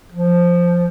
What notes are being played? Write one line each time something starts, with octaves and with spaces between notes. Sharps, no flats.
F3